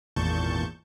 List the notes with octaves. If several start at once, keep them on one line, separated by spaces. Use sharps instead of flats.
G#1 E2 A#2 A5 C#6 G6